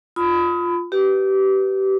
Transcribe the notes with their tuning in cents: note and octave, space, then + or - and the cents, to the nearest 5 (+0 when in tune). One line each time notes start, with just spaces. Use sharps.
F4 +0 B5 +25 D#6 +30
G4 -25 B4 +0